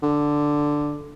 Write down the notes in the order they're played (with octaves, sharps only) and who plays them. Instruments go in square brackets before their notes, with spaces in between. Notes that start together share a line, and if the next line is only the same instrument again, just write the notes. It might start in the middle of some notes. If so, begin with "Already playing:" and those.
[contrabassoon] D3